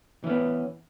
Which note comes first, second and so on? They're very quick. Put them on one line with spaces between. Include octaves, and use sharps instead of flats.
E3 C#4 B3